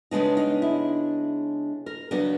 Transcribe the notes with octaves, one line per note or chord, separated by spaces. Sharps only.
C#3 F3 G#3 B3 D4 D#4
D#4
E4
A#4
C#3 F#3 B3 D4 A#4